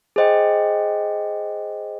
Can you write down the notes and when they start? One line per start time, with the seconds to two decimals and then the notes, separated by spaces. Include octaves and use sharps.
0.16 G#4 C5 D#5 G5